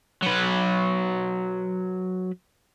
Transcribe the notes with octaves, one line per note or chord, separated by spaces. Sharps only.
F#3 B4